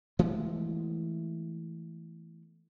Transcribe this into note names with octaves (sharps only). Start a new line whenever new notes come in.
E3 G#3 A3 B3